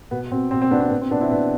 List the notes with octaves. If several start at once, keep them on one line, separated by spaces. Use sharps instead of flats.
B2 B3
B2 C4
B2 C4
C4
B2 B3 D4
C4
B2 B3
C4
B2 B3 D4
C4 E4
B2 B3 D4